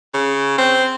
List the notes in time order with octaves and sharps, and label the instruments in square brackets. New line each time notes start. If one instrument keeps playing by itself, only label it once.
[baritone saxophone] C#3
C4